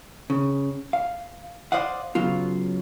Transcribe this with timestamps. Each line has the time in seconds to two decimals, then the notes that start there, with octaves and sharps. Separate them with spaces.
0.30 C#3
0.93 F5
1.72 C5 D5 D#5 F5 F#5
2.15 C#3 F#3 B3 F4